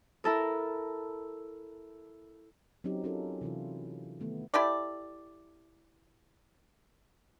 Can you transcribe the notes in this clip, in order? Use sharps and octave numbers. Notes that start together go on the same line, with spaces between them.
E4 A4 A#4
F#3 C4 C#4 D#4 G4
C#4 D#4 F4 A4 A#4
C3 E3 E4 F4
D#3 A3 B3
E4 G4 A4 D5